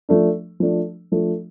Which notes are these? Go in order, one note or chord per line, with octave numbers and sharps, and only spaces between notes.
F3 A3 D4
F3 A3 D4
F3 A3 D4